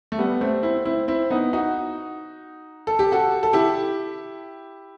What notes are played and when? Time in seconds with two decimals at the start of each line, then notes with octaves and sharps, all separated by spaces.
0.12 A3
0.18 G3 B3
0.41 A3 C4
0.63 C4 E4
0.85 C4 E4
1.08 C4 E4
1.30 B3 D#4
1.53 D#4 F#4
2.87 A4
2.99 G4
3.12 F#4 A4
3.43 A4
3.53 E4 G4